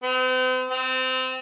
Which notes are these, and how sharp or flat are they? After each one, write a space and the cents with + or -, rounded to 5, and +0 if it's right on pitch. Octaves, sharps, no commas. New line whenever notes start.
C4 -40
C4 -20